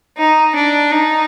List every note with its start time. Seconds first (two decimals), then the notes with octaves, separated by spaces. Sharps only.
0.18 D#4
0.55 D4
0.92 D#4